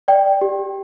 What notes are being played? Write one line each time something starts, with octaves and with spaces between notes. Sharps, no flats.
D5 G5
G4